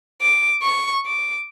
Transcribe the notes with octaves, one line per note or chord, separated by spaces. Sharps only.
D6
C#6
D6